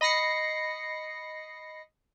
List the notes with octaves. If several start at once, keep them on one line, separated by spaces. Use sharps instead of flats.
D#5 B5 A#6 C7 C#7